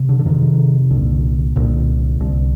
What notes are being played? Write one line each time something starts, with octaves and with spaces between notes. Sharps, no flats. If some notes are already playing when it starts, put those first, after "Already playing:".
Already playing: C3
D3
D3
F2 C3 D#3
C2 A#2 D3
C2 A#2 D3
C2 C3